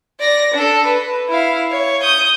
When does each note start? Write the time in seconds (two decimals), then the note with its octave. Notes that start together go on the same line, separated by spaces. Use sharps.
0.20 D5 A#6
0.54 D4 A4
0.86 B4
1.29 E4 F5
1.71 C#5
2.02 D#6 G6